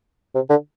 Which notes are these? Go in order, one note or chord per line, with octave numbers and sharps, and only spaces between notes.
C3
D3